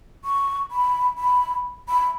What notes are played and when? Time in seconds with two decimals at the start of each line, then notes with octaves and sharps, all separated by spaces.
0.24 C#6
0.71 B5
1.18 B5
1.89 B5